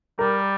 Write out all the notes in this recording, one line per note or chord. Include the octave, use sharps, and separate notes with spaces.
G3 A#4